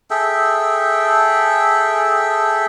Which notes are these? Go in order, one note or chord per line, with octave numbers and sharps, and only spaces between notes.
G#4 A4 E5 G5